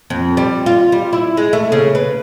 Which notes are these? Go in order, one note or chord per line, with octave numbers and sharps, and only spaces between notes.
F2
G3
F4
G3
E4
G#3
A3
C#3
B4